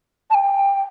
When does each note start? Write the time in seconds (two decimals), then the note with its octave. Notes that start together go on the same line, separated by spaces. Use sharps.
0.30 A5
0.34 G5